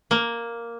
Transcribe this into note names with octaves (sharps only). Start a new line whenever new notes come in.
A#3